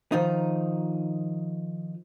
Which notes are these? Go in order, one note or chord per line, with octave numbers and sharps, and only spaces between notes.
D#3 F3 D#4